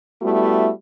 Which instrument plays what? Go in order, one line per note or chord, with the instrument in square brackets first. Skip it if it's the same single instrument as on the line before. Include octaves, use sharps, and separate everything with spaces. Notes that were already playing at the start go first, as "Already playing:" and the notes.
[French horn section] G3 A3 B3 E4 F#4